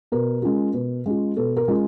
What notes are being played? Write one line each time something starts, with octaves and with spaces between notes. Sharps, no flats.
B2 A#4
G#3 C#4 F4
B2
G#3 C#4 F4
B2 A4
A#4
G#3 C#4 F4